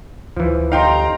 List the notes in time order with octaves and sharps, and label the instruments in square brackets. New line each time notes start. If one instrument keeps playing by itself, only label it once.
[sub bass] D2 [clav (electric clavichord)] E3 F3
[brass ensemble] G1 G4 A#5 [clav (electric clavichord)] D#4 [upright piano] F5 G5 C6